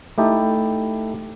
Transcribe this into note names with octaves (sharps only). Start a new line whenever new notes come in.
A3 D#4 E4 G4 A4